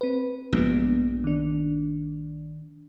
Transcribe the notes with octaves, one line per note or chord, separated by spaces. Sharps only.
C4 B4
A#1 G2 G#3 B3
D#3 D4